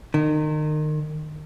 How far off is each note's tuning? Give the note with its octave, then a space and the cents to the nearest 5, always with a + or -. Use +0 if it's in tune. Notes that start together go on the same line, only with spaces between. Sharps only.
D#3 -30